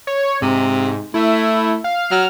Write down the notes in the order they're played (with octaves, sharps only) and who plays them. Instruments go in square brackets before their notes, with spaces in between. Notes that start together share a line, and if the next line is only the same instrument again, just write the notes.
[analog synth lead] C#5
[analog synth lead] G#2 [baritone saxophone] C3
[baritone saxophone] A3 [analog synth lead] E4
[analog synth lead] F5
[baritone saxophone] F#3 [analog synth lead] F6